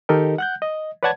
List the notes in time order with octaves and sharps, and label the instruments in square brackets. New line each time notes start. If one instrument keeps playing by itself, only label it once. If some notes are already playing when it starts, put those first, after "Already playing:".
[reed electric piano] D#3 D#4 G4 A4 A#4 D#5
F#5 F#6 G6
D#5
B4 C#5 D5 F#5 A5 G#6